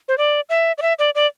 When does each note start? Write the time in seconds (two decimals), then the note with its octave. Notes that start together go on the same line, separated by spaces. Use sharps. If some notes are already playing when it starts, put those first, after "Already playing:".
0.08 C5
0.18 D5
0.49 E5
0.78 D5
0.82 E5
0.99 D5
1.15 D5